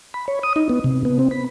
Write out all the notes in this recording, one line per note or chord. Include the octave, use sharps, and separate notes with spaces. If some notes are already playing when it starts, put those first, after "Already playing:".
B5
C#5
D#6
D#4
B3
C3
B3
C4
B5